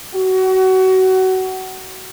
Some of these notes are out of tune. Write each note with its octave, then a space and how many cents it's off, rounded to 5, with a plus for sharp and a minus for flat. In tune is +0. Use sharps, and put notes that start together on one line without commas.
F#4 +25